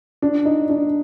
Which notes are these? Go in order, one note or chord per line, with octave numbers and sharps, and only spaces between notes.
D4
D#4
D4